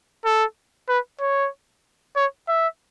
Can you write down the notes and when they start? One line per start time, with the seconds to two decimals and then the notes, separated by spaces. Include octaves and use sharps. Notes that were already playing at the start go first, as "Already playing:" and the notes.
0.25 A4
0.89 B4
1.20 C#5
2.16 C#5
2.48 E5